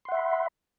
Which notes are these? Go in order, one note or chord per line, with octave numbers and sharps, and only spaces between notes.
E5 F#5 B5 C6